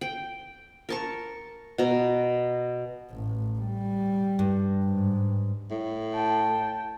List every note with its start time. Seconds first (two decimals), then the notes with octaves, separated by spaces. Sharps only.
0.01 G5
0.89 A#4 A5 C#6
1.78 B2 A#5
3.11 A1
3.59 G3
4.39 G2
4.85 G#2
5.71 A2
6.14 G5 A5